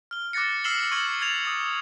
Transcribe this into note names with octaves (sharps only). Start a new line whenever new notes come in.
F6 G7
D6 F#6 A6 A#6 C#7
E6 F6 C7 E7 F#7 G7
C#6 F6 G#6 A6 C#7 F#7
G#6 A6 F7
D#6 A6